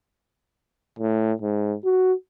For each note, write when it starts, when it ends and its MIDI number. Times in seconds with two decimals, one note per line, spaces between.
0.99 1.33 45
1.42 1.75 44
1.85 2.13 66